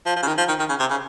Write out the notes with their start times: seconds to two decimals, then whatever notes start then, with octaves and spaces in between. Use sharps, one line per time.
0.06 F3
0.16 F3
0.23 C#3
0.28 D#3
0.38 F3
0.48 D#3
0.59 D#3
0.69 C#3
0.80 C3
0.91 C#3